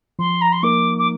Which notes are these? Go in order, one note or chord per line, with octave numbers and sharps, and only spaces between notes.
F3 C6
A#5
C6
A#3 D#4 A#4 D6
D6